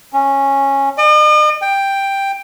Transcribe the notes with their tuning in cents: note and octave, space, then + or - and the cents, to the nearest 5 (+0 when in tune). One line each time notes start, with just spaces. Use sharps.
C#4 -10
D#5 -45
G5 +5